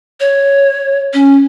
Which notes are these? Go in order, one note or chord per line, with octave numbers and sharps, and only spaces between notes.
C#5
C#4